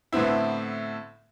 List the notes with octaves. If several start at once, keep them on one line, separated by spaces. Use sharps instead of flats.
A2 D3 B3 C4 E4